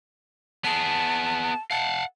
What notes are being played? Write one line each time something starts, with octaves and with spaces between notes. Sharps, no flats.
B3 G#4 A5
F5 F#5 A5